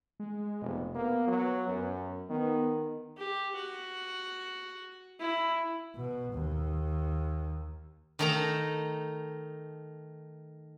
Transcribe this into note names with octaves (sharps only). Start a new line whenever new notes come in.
G#3
F1 B2
A#3 B3
F#3
F#2
D#3 B3
G4
F#4
E4
B2
D#2
D#3 A3 D#4 A#4 A#5